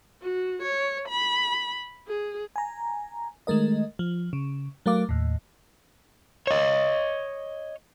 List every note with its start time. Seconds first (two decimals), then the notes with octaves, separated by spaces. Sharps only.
0.22 F#4
0.62 C#5
1.08 B5
2.08 G#4
2.56 G#5 A#5
3.47 D#3 G#3 A3 A#4 D#5
3.99 F3
4.33 C#3
4.86 F#3 A3 A#4 F5 D6
5.09 D#2 A2
6.47 C#5 D#5